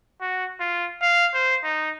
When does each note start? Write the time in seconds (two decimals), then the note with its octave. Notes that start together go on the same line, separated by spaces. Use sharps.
0.21 F#4
0.60 F4
1.02 F5
1.34 C5
1.64 D#4